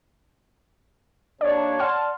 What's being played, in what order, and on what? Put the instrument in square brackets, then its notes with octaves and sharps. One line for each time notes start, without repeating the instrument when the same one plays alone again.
[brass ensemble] D#2 D4 [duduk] C#5 [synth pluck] D5
[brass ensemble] D5 A5 [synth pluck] F#5 C6 F6